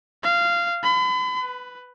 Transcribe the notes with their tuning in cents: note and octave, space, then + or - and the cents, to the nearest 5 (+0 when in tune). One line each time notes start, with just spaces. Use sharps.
F5 -15
B5 +40
B4 +10